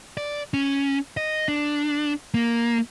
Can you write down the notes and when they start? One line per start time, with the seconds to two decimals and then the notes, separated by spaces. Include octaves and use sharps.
0.17 D5
0.54 C#4
1.17 D#5
1.48 D4
2.34 A#3